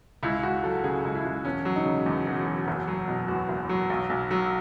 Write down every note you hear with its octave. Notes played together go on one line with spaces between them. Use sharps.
C#2 E4
C#2 F#4
F#3 A4
C#3 G#4
C#2
E4
C#2
E1 C#4
F#3
D#4
C#3
E2
E1
F#3
F#1
F#3
B2
E2 F#4
F#1
F#3
B1
B1
F#3